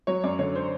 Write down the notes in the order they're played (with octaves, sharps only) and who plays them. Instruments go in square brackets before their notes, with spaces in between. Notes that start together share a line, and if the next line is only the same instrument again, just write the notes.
[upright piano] F#3 C#5
F#2 D5
D3 C#5
C5